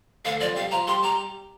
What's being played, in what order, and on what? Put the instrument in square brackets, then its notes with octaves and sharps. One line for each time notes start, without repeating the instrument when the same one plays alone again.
[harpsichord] D2 D3 [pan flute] F5
[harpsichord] F2 F3 [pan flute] D5
[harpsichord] G3 G4 [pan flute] F5
[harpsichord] F3 F4 [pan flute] A#5
[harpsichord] G3 G4 [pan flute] C6
[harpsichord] G3 G4 [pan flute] A#5